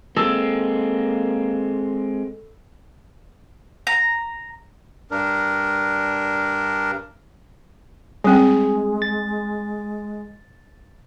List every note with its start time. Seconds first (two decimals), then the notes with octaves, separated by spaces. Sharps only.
0.16 G#3 A#3 C4 A4
3.87 A#5
5.11 G2 D4 A#4
8.24 G3 G#3 C4 G#4
9.02 A6